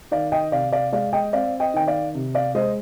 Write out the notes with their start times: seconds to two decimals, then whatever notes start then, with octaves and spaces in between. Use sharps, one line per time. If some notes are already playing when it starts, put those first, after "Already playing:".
0.11 D#3 D5 F5
0.32 D#5 G5
0.52 C3 D5 F5
0.72 D5 F5
0.92 G#3 D5 F5
1.13 D#5 G5
1.33 C4 D5 F5
1.60 D#5 G5
1.74 D#3 G5
1.87 D5 F5
2.14 C3
2.35 D5 F5
2.55 G#3 C5 D#5